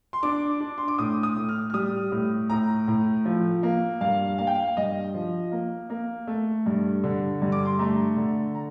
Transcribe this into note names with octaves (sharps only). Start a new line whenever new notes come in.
C6
D4 D6
D4
C6
D6
A2 D#6
D#6
A2
F6
F6
G3 D#6
A2
A2 A#5
A2
F3
A#3
G2 F5
A#3 F5
G5
F5
G2 D#5
F3
A#3
A#3
A3
G2
D3
G2
D6
C6
A3 A#5
D3
A#5